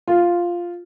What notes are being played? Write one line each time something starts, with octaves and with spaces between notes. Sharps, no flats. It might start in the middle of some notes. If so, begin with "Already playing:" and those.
F4